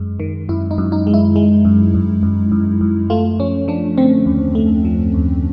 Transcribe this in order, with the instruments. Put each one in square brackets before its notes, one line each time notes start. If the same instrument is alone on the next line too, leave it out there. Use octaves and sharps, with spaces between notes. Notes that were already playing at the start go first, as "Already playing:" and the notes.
Already playing: [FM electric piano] F#2 G#3
D#3
F#2 E4
D#4
F#2
D#4
G#3
E4
G#3
F#2
F#2
F#2
F#2
F#2
A3 F4
F3 C#4
F3 D4
D3 C4
D#2
A3
F3
D#2